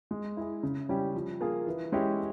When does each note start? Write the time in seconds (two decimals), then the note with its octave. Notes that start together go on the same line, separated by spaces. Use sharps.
0.11 G#3
0.37 E4 G#4
0.63 C#3
0.89 G3 C#4 E4 G4
1.14 F3
1.41 A#3 F4 G#4
1.67 E3
1.92 G#3 C#4 E4 G4